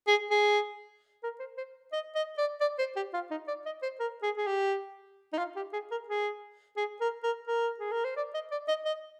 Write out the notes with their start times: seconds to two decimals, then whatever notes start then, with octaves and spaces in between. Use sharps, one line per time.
0.08 G#4
0.31 G#4
1.23 A#4
1.40 C5
1.58 C5
1.93 D#5
2.15 D#5
2.38 D5
2.61 D5
2.79 C5
2.96 G4
3.14 F4
3.31 D#4
3.48 D5
3.66 D#5
3.83 C5
4.00 A#4
4.23 G#4
4.37 G#4
4.47 G4
5.33 D#4
5.38 F4
5.56 G4
5.73 G#4
5.91 A#4
6.08 G#4
6.77 G#4
7.01 A#4
7.23 A#4
7.47 A#4
7.80 G#4
7.92 A#4
8.04 C5
8.17 D5
8.34 D#5
8.52 D5
8.68 D#5
8.85 D#5